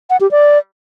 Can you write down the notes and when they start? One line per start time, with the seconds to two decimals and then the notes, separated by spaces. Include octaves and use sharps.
0.10 F#5
0.21 G4
0.31 D5